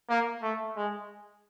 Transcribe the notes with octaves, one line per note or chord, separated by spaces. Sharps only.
A#3
A3
G#3